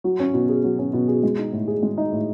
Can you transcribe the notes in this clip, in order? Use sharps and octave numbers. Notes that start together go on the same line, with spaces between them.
F#3
C#4
B2
G#4
F#3
C#4
B2
G#4
G#3
D#4
A2
G#4
G#3
D#4
A2